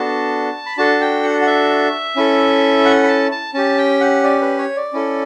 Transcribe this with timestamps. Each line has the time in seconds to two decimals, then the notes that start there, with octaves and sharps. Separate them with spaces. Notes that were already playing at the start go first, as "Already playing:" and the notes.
Already playing: B3 D4 F#4 A4 A5
0.66 B5
0.77 D4 F#4 A4 A5
1.01 G5
1.23 F#5
1.42 F#5
1.47 E5
2.16 C#4 E4 A4
2.85 F#5
3.03 B5
3.08 A5
3.32 A5
3.54 C#4 G4 A5
3.78 G5
4.01 F#5
4.23 D5
4.42 B4
4.58 C#5
4.76 D5
4.93 C#4 E4 A4